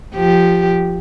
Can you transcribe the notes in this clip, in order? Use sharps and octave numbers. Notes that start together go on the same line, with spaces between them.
F3 G4